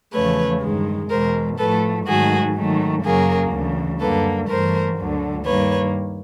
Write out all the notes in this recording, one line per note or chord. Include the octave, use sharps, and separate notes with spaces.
E2 C#3 F3 A3 B4 C#5
G2 D#3 G#3
E2 B2 G#3 A#4 C5
A2 F3 A3 A4 B4
G#2 D#3 F#3 A3 F#4 G#4
G#2 D#3 F#3 A3
F#2 C#3 F#3 A#3 G#4 A#4
D2 C#3 E3
F#2 D3 G3 A#3 A4 B4
G2 E3 A3 A#4 C5
D2 D3 F#3
G2 D#3 G3 A#3 B4 C#5